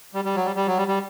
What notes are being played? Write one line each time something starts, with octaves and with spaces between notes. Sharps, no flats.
G3
G3
F#3
G3
G3
F#3
G3
G3